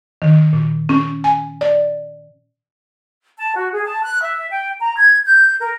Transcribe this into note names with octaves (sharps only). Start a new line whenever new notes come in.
D#3
A#2
C#4
G#5
D5
A5
F#4
G#4
A5
F#6
E5
G5
A#5
G#6
G6
A#4